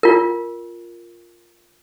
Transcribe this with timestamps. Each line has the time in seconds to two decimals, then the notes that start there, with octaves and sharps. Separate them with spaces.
0.03 F4 A#4